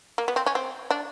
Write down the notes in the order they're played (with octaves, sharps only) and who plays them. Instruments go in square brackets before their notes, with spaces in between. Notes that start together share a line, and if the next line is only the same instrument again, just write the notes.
[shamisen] A#3
B3
C4
C#4
C4
D4